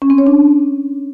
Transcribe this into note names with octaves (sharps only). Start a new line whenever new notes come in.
C#4
C4
C#5
D4